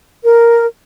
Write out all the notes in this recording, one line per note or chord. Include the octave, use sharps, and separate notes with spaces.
A#4